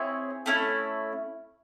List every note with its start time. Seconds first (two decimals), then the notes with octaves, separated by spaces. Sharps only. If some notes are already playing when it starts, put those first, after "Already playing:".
Already playing: C4 E4 G#4 C#5
0.46 A3 C#4 E4